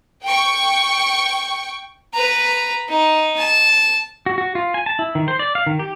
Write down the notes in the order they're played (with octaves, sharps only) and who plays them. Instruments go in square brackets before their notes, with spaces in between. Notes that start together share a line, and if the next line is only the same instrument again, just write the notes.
[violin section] G5 C#6
[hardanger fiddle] B4 A#5
D#4
A5
[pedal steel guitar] F#4
F#4
F4
G#5
A5
E4
D#3
C5
D5
F5
D#3
G4